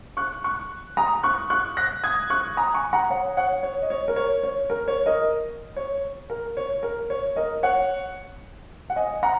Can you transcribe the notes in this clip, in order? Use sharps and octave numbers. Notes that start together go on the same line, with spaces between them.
C#6 F#6
C#6 F#6
A#5 D#6
C#6 F#6
C#6 F#6
F#6 A#6
D#6 G#6
C#6 F#6
A#5 D#6
G#5 C#6
F#5 A#5
C#5 F#5
C#5 F#5
C#5
D#5
C#5
A#4
C#5
C#5
A#4
C#5
A#4 D#5
C#5
A#4
C#5
A#4
C#5
A#4 D#5
C#5 F#5
F#5
D#5 G#5
F#5 A#5